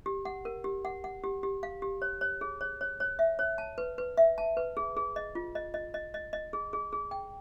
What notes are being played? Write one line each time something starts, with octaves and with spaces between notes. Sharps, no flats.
G4
F#5
A#4
G4
F#5
F#5
G4
G4
F5
G4
C#5
C#5
G#4
C#5
C#5
C#5
E5
C#5
A5
B4
B4
E5
A5
B4
G#4
G#4
D#5
F4
D#5
D#5
D#5
D#5
D#5
G#4
G#4
G#4
G5